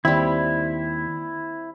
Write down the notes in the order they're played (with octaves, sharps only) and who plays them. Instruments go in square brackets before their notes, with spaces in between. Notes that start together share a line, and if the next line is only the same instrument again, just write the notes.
[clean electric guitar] D#2 [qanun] G3 C4 [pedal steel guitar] E4